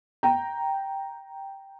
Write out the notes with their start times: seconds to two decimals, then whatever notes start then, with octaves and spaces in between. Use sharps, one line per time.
0.23 G5 A#5